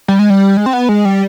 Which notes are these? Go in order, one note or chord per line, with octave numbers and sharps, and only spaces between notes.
G3
G#3
G3
G#3
C4
B3
G#3
G3